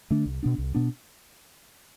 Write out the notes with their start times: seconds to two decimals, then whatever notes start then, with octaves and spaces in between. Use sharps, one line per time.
0.11 D3 A3 D4
0.26 C2
0.43 B2 B3 D4
0.58 C2
0.74 B2 B3 D4